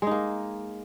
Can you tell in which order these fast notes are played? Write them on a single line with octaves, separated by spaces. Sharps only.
G#3 D#4 A#3